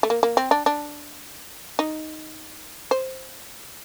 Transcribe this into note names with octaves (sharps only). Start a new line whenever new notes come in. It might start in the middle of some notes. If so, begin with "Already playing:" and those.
A3
A#3
A#3
C4
D4
D4
D#4
C5